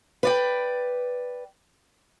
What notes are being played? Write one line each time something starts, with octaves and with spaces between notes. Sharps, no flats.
B4 D5 G5